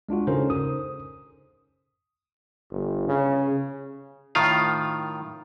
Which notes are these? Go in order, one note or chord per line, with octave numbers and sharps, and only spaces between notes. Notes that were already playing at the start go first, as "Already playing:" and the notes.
G#3 D4 F4 F#4
C#3 C#4 D#4 A4 A#4 C5
D#6
G1
C#3
A2 D#3 F4 F5